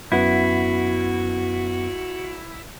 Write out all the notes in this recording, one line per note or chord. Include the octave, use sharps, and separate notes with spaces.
F#2 B3 E4 F#4